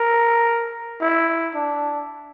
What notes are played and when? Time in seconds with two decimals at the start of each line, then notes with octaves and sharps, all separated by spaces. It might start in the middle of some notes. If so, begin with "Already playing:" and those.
Already playing: A#4
1.01 E4
1.54 D4